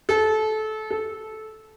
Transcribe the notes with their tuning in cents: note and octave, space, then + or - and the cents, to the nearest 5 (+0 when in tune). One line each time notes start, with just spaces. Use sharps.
A4 -25
A4 -15